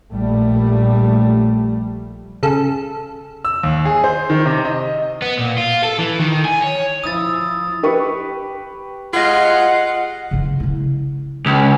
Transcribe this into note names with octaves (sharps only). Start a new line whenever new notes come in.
A#1 G3 A3
C#3 A4
E6
D#2
G#4
C5
D#3
C3
D#5
B3
A#2
F4
A4
E3
D#3
G#5
C#5
F3 E4 D#6 A6
G4 B4 C#6
F4 G#4 D#5 F#5
C#3 E3
C#3 E4
C#2